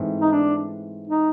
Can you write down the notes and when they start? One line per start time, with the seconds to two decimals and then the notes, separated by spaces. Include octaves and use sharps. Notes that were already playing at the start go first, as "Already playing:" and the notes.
Already playing: G#2 E3 A3 C4
0.22 D#4
0.32 D4
1.08 D#4